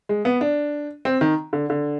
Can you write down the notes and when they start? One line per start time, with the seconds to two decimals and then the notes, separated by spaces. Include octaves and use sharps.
0.09 G#3
0.25 B3
0.41 D4
1.05 C4
1.21 D#3
1.53 D3
1.70 D3